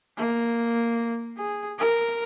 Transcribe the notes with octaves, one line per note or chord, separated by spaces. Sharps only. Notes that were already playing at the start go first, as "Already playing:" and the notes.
A#3
G#4
A#4